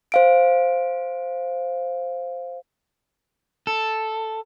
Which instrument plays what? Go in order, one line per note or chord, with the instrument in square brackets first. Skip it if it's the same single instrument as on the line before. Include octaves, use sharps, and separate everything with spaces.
[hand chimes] C5 F5 D7
[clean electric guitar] A4